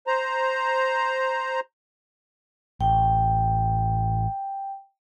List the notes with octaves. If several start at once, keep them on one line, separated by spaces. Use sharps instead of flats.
C5 A#5
A1 G5